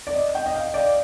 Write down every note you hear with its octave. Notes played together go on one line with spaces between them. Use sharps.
D5
D#5
G5
D#5
F5
D5